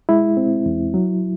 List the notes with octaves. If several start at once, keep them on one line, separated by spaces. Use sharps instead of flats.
G#3 E4
C4
E2
F#3